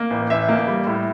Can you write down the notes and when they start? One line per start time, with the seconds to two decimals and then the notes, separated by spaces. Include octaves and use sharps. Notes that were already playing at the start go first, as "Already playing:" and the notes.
Already playing: A#3
0.10 A1
0.30 A1 E5
0.49 A#3
0.68 G3
0.87 A2